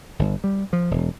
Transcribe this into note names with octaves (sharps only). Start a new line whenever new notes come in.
G1
G3
F3
E1